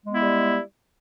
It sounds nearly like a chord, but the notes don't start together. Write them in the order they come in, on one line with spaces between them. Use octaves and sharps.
G#3 B3 E4 G3